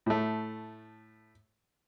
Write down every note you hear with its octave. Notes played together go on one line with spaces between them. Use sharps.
A2 A3